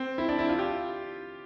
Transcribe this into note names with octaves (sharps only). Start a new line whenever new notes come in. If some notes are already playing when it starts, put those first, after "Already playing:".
Already playing: C4
E4
D4
E4
F4
G4